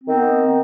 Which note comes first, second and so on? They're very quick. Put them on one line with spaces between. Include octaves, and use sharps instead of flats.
C4 D#3 B3